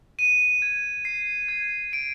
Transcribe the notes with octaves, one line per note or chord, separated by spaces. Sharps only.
D#7
G#6
C7
G#6
D7